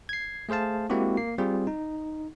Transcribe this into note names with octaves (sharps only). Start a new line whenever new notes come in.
G#6 C7
A3 G#4 C5 F5 A5
G#3 A#3 C4 E4 F#4 G4
A#3 C7
G3 C4 F4 G#4
D#4